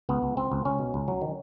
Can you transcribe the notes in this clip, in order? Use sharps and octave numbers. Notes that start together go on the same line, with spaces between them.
C#2 B3
C#2
C#2 C4
C#2
C#2 C#4
B2
C#2
F#3
D#3